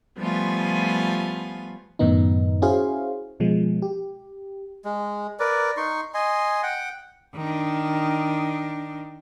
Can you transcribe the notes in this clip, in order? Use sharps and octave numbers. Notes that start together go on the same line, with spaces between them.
F3 G3 A3 B3 F4 G#5
F#2 A2 D#3 B3 D#4
C#4 E4 F#4 G#4 C5 F5
B2 F3 G#3
G4
G#3
A#4 B4 D5
D#4 C6 C#6
D#5 G#5 C6
F#5 G5
D#3 D4